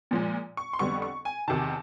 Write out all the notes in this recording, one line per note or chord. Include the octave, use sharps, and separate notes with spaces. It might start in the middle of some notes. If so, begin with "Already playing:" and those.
A#2 F3 G#3
C#6
C6
F2 D3 G3 B3 C#6
C#6
G#5
E2 C3 D#3 A5